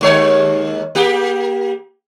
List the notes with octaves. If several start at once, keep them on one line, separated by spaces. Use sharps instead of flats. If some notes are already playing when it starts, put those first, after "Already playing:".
D#2 G#3 C#5
A#3 G4